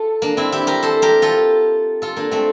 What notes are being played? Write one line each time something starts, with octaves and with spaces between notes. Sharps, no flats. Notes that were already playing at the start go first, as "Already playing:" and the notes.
Already playing: F4 A4
A#3 D4
C4 E4
E4 G4
G4 A#4
A4 C5
G4 A#4
F4 A4
F4 A4
A#3 D4
A3 C4